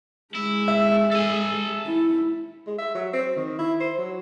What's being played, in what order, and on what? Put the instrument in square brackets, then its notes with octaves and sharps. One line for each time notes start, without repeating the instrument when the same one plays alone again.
[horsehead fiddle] G#3 [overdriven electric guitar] E4
[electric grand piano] E5
[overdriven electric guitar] A4 G#5
[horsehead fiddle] E4
[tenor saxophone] G#3
E5
F#3
C4
D#3
E4
C5
F#3